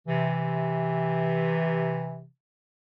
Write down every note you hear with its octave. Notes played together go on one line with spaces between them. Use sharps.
C3 E3